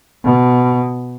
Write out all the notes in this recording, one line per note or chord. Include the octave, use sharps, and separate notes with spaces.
B2